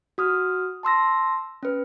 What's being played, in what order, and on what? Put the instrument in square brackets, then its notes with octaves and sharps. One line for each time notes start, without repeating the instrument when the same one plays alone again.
[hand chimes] F#4 D#6 F6
A5 C6 E6 A#6
C#4 B4